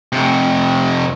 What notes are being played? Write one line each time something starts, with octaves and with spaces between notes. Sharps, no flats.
F2 C3